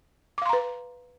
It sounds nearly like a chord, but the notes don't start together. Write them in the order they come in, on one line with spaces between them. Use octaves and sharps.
D6 F5 C6 A#5 B4